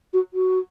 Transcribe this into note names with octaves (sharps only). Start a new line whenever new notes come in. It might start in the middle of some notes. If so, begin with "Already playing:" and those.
F#4
F#4